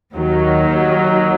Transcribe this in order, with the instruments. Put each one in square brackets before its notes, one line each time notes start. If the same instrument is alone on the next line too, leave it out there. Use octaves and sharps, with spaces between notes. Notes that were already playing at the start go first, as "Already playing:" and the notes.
[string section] D#2 D#3 F#3